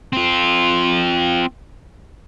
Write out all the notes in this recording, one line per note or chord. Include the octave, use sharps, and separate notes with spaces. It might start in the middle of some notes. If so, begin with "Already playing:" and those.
C4 F4